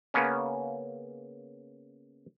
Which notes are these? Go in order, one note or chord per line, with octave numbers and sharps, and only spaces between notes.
C#3 A#3 B3 C#4